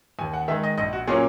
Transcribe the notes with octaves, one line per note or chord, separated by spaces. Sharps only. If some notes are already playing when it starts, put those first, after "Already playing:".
D#2 G#5
F#5
D#3 G#3 E5
D#5
A#1 D#5
F#4
A#2 F#3 A#3 C#4 G#4